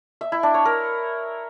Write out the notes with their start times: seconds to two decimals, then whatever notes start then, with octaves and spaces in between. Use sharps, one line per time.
0.21 E5
0.32 E4
0.43 D4
0.54 C#5
0.65 A#4